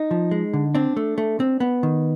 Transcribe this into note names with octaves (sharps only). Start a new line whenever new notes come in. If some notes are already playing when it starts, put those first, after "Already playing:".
Already playing: D#4
F3
G#3
D3
C4 D4
A3
A3
C4
B3
D#3